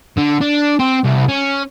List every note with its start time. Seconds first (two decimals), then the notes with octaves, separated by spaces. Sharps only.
0.18 D3
0.41 D4
0.80 C4
1.04 C2
1.28 C#4